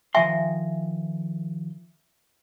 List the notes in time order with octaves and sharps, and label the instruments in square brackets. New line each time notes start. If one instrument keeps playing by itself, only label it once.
[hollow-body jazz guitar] D#3 F3 C6 [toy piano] E5 G5 G#5